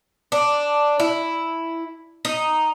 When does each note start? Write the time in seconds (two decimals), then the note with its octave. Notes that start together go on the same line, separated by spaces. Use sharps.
0.32 D4
1.00 E4
2.25 D#4